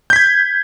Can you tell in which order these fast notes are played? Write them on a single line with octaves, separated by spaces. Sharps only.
G6 B6 G#6